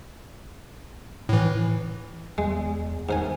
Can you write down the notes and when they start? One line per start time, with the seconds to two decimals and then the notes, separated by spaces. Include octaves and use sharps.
1.29 A2 E3
2.38 E2 G#3
3.09 G#2 A#4 G#5